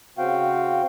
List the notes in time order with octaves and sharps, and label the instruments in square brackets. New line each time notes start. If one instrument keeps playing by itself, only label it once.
[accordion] C#3 C4 F#4 F5 G5